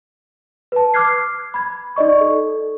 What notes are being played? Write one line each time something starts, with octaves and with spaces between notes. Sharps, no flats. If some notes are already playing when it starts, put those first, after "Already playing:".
B4 A5
D6 F6 F#6 G#6 C7
B5 G#6
D#4 D5 D#5 C#6
A4